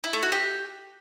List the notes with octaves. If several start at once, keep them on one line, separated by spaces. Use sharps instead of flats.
E4
A3
F#4
G4